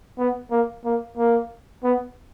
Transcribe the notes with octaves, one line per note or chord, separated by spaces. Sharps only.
B3
A#3
A#3
A#3
B3